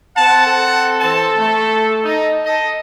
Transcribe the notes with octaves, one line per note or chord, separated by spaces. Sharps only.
C4 F#5 A5
A4
E3 C4 A5
A3
D#4
A4 D#5